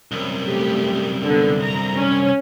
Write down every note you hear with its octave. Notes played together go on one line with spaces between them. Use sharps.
C2 F#2
A3 G4
D3 B3
A#5
C#4